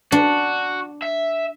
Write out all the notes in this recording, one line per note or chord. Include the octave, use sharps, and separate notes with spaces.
D4 F#4
E5